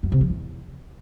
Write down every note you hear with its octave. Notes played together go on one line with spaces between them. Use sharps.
F#2
C3
F3
E2